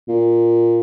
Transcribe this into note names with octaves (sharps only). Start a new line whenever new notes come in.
A#2